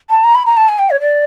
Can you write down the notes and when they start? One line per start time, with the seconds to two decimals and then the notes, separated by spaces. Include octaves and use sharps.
0.10 A5
0.24 A#5
0.35 B5
0.46 A#5
0.57 A5
0.68 G#5
0.79 G5
0.90 C#5
1.00 D5